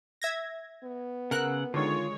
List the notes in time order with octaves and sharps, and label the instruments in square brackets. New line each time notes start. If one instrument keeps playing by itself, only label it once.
[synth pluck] E5 G#6 A#6
[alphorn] B3
[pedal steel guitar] C#3 F#5 E6 [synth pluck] A#4 F#6
[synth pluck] D3 D#3 [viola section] G#3 C#5 [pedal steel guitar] F4